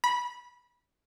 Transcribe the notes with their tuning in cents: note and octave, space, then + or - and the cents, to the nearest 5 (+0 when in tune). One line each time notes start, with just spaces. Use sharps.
B5 -20